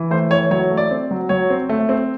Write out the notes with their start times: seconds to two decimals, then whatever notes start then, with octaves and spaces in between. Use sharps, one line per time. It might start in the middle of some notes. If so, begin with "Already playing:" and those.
Already playing: E3
0.11 A3 C5
0.31 E3 C#5
0.51 F#3 C#5
0.70 A3
0.77 D5
0.91 C4
1.11 F#3
1.29 F#3 C#5
1.50 C4
1.69 A3
1.89 C4